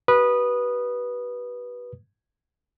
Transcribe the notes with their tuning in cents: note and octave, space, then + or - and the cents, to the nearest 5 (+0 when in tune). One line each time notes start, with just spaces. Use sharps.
G4 -45 B4 -15 D#6 -15